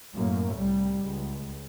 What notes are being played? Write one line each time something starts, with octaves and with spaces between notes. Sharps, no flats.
F#2 A2 A#3
C2 G3
C#2